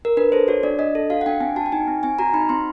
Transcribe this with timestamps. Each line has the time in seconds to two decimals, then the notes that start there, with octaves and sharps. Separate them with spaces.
0.05 A#4
0.17 D4 B4
0.32 A4 C5
0.48 F#4 C#5
0.63 D4 D5
0.79 D4 D#5
0.95 A4
1.10 F#4 F5
1.21 F#5
1.26 D4 G5
1.40 C4 G#5
1.56 F#4 A5
1.66 G5
1.72 D#4 G#5
1.88 C4
2.03 C4 G#5
2.19 F#4 A#5
2.34 D#4 B5
2.49 C4 C6